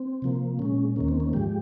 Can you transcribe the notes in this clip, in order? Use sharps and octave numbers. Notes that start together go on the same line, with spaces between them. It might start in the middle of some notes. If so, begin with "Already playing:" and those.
Already playing: C4
C3 F3 A#3
A#2 G#3 C#4
D#2 D#3 A#3 C#4
C4
C#4
G#2 F3 G#3 G4